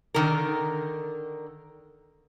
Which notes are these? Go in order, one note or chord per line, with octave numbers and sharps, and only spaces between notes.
D3 D#3 A#4